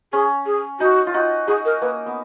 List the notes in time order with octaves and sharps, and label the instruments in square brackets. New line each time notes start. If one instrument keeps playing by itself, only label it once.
[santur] C#4 [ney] G#4
[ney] G#4
[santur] D#4 [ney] F#4
[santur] F4
D#4 F#4
[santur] D#4 F#4 [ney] G#4
[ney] A#4
[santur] A#3 [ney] B4
[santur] B3